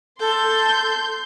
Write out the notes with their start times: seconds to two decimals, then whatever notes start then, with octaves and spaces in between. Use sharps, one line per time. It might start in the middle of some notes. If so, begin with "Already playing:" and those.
0.20 A4 C6 G6